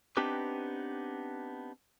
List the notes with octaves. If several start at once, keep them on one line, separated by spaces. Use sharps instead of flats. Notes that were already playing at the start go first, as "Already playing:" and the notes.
B3 C4 D4 D#4 G4 B4